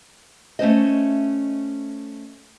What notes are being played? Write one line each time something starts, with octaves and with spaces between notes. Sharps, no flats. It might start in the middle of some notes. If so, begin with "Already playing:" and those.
A3 C#4 C5 D#5